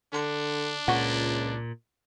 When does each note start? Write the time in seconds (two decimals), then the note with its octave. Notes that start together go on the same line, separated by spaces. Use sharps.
0.13 D3 D4
0.88 C#2 A#2 F#5 C#6